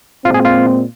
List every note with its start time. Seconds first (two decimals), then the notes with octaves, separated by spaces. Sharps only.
0.25 A#2 G#3 C4 F4
0.34 G#4
0.45 F4